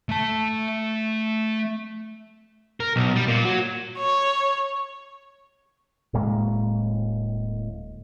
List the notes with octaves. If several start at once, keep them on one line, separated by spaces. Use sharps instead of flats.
A3 A5
A#4
B1
G3
A#2
F#3
C#5
D1 A2 G#3 A#3